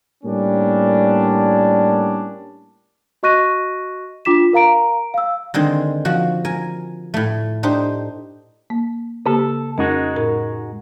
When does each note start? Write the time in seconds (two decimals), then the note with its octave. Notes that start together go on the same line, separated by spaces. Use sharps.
0.24 A2 G3 A#3 C#4 D4
3.23 F#4 D#5 C#6 F#6 A#6 D#7
4.25 D4 F4 D6 B6 E7
4.53 A#4 F5 A#5 D7
5.14 F5 E6
5.54 D3 D#3 G#3 C4
6.05 F3 F#4
6.45 A#4 G#5
7.14 A2 A3
7.63 D4 D#4 G4 C5
8.70 A#3
9.26 C#3 A#3 G4 A4
9.78 F2 G#3 C#4 D#4 F#4 A#4
10.16 A2 A#4